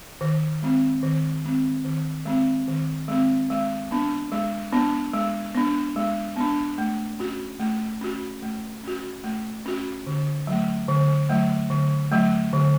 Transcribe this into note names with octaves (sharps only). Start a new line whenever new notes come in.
D#3
G#3 C4
D#3
G#3 C4
D#3
G#3 C4
D#3
G#3 C4
G#3
B3 D4
G#3
B3 D4
G#3
B3 D4
G#3
B3 D4
A3
C#4 F#4
A3
C#4 F#4
A3
C#4 F#4
A3
C#4 F#4
D3
F#3 A3
D3
F#3 A3
D3
F#3 A3
D3